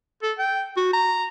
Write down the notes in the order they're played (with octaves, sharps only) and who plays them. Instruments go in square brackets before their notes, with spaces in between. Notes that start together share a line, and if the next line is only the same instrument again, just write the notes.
[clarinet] A4
G5
F#4
A#5